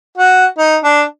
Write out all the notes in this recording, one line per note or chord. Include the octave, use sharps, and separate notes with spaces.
F#4
D#4
D4